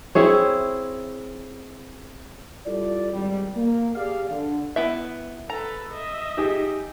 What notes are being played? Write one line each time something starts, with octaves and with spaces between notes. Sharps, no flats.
C4 E4 G#4 C#5
G3 E4 F4 A4 D5
G#1 G3
A#3
G4 G#4 D5 F5
D3
B3 E4 E5
A4 B4 A#5
D#5 E5
D#4 G4 G#4